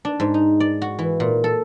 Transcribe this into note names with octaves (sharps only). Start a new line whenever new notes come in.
D4
G#2
D#4
D5
F#4
E3
A#2
A4